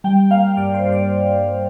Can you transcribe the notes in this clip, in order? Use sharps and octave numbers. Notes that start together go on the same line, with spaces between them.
G3 G5
A#3 F5
G2 D5
C5
G2
D5